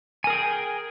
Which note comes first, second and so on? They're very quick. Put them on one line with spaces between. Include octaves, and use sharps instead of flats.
G#5 A#4 G#4 G5